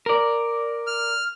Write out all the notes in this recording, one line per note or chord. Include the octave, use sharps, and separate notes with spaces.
A#4 D5
F6